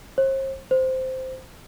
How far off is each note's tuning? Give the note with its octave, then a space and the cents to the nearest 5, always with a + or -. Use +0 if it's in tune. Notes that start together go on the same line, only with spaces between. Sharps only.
C5 +40
C5 -10